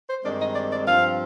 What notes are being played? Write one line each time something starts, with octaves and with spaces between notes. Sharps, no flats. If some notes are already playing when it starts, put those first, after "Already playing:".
C5
G2 D#3 G#3 C4 D5
D#5
D5
D5
G2 F3 C4 F5